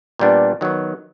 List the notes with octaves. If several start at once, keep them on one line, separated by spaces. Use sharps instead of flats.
A#2 G3 B3 D4
D#3 F#3 B3